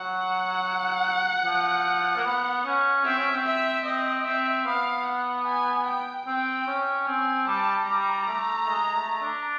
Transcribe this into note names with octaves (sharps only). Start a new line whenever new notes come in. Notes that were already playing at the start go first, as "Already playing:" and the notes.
Already playing: F#3 F#5
F3
A#3
B3
C#4
C4 E5
C#4
C4
E5
C4 D#5
C4 E5
B3 F5
F#5
G#5
G5
C4 G5
C#4
C4 G#5
G3 A5
G3 A#5
A3
G#3
A3
D4